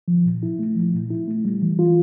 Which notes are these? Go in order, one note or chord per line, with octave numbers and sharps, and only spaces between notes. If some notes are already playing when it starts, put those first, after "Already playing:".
F3
A#2
E4
A3
F3
A#2
E4
A3
G3
E3
F4